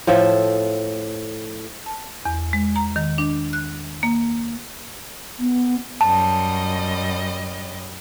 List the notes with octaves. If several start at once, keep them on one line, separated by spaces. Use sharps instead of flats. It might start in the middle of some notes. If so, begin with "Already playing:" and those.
A2 F3 A4 E5
A5
E2
G#3
A#5
D#3
D4
F#6
A#3
B3
F#2 G3 D#5 A5